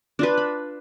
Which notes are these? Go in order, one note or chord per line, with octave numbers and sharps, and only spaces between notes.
D4 F4 B4
B5